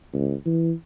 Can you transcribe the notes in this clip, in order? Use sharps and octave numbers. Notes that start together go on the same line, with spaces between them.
C#2
E3